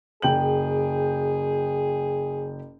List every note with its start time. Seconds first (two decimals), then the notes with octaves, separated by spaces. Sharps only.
0.22 F#1 G#4 G5 F#7